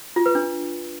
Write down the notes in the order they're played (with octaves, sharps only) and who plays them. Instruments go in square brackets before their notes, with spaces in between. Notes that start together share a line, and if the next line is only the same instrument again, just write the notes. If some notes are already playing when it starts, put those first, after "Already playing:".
[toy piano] F4
B4
D4